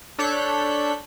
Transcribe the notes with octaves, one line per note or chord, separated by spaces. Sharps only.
D4 A4 C#5 F#6 G6 B6